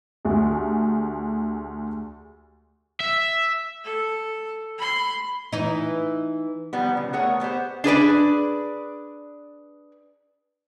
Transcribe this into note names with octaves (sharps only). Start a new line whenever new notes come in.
D2 G4 G#4
E5
A4
B5 C6
E3 D#4
D#3 F3 G3 B3
C#3
A3 B3 G#4 A#4 C#5 F#5
G3 B3 G4 C5
D4 G#4 B4 D5